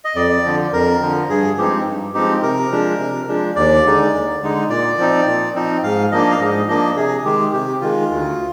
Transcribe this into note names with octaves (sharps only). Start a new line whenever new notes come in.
D#5
F2 D5
D3 F3
F2 A#4
D3 F3
G2 G#4
F3 G#3 C4 D#4 G4
G2
F3 G#3 C4 D#4 G4
C3 A#4
F3 G#3 D4
C3
F3 G#3 D4
D#2 D5
D3 G#3 D#4
D#2
D3 G#3 D#4
A#2 D5
F3 C4 D#4
A#2
F3 C4 D#4
G#2 F5
F3 A#3 D4 D#5
F5
G#2 D#5
F3 A#3 D4 D#5
C3 G#4
D#3 G#3 G4
C3 G4
D#3 G#3 F4
D2